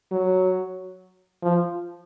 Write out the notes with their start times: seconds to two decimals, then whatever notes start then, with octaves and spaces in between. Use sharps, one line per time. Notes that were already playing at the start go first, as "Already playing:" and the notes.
0.11 F#3
1.42 F3